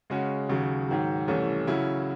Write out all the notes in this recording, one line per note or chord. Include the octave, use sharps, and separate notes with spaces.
C#3 G#3 C#4 F#4
D#2 C#3 F#3
G#2 D#3 F#3
C2 C3 E3 A3 C#4
C#3 F#3 C#4 E4